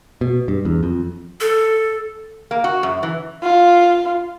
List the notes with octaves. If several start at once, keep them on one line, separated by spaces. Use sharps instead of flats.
B2
G2
E2
F2
A4
A#3
F#4
F#2
E3
F4